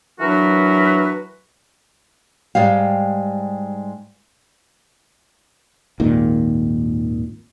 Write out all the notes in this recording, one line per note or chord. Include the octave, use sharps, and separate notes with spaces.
E3 F#3 D4 F#4 A#4 B4
G#2 G3 G#3 G4 F5
G#1 D#2 A#2 D#3